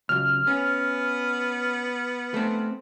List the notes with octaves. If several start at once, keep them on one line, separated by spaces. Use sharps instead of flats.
C#2 F#2 F6
B3 C#4
A3 C4